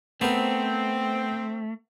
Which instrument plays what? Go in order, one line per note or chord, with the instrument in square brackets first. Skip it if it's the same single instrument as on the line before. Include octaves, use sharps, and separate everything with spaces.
[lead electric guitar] A3 [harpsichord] B3 A#4 [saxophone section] C4